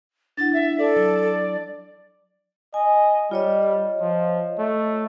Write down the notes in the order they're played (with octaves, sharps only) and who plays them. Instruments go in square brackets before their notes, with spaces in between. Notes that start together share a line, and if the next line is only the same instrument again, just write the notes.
[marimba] D4 E4 F#5 [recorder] A6
[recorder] E5
[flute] A4 [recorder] D5
[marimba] F#3
[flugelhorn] D#5 [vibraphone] G#5
[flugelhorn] G3 [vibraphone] F4 C#5 D#5
[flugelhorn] F3
A3